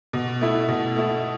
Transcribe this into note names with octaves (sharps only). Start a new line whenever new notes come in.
B2
A3 E4
B2
A3 E4